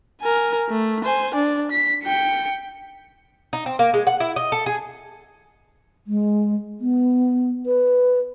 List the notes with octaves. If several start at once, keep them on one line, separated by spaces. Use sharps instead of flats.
A#4 G#5
A3
C5 G#5
D4 D5
B6
G5 C#7
D#4
C4
A#3
G#3
F#5
E4
D#5
A4
G#4
G#3
B3
B4